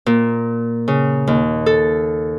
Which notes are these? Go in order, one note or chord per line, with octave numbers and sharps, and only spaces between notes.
A#2
C#3
D#2
A4